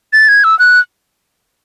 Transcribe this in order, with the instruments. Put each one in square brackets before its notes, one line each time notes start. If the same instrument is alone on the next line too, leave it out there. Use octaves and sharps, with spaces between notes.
[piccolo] A6
G#6
E6
F#6